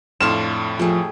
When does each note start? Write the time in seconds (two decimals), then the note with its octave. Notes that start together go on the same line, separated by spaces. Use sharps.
0.21 F2 A2 D4 F5 A5 C6 F6 E7
0.79 F3 A3 G4 G#4